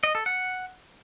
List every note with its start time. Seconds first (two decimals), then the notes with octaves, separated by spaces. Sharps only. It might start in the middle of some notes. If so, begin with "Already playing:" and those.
0.03 D#5
0.15 A4
0.26 F#5